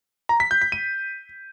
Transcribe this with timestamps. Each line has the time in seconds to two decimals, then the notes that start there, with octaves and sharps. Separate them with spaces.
0.29 A#5
0.40 B6
0.51 G6
0.62 B6
0.72 D#7